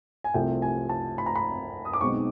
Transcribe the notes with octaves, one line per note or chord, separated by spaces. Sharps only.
G#5
C2 C3 F3 A3 G5
G#5
A5
B5
A#5
B5
D#6
D6
B1 B2 G#3 C4 D#4 C#6